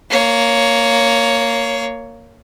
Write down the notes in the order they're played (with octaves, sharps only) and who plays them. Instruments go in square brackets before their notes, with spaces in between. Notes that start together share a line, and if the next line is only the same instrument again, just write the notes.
[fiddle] A#3 C#5